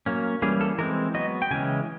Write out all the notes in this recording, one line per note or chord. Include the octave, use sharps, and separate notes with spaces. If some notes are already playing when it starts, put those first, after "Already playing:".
F#3 A#3 C#4
E3 G3 A#3 C#4 G#4
A4
E3 G#3 C4 A#4
F#3 B3 D#5
G5
C#3 E3 G#3 C#4 G#5